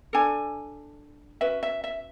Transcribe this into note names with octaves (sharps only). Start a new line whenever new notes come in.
D4 A4 G#5
C#4 F#4 B4 E5
E5
E5